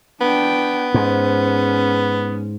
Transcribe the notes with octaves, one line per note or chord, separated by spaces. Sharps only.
B3 D4 G5
G#2 C#4